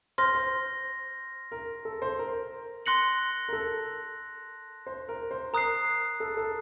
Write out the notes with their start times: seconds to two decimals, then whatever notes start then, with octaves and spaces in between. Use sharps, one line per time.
0.18 C5 C6 F6 A#6
0.35 C5
1.52 A#4
1.85 A4
2.02 C5
2.19 A#4
2.86 C6 F#6 A#6 C#7 F#7
3.48 A#4
3.53 A4
4.87 C5
5.09 A#4
5.31 C5
5.53 A#4 A#5 D#6 F#6 C7
6.20 A4
6.37 A4